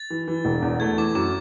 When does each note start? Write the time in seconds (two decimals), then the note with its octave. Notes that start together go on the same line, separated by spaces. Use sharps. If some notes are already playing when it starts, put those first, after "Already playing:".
Already playing: A6
0.10 E3
0.28 E3
0.45 E1
0.62 E2
0.80 A3 G#6
0.97 E3 D6
1.15 F#2 D6